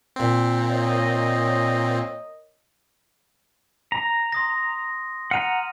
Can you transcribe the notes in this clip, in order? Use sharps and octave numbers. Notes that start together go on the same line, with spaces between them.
A#2 C4
A#4 C#5 D#5
A#5
C6 D#6 A#6
F#5 A#5 F6 D#7